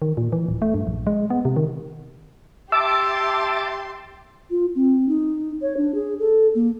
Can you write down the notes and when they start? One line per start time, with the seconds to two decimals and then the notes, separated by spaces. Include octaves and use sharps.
0.02 D#3
0.17 A#2
0.32 E3
0.49 D1
0.62 A3
0.74 G2
0.87 A#1
1.07 G#3
1.30 B3
1.45 C3
1.56 D#3
2.72 G4 E5 A5 C6 D6 E6
4.50 F4
4.76 C4
5.09 D#4
5.62 C#5
5.77 D4
5.95 G#4
6.20 A4
6.55 A#3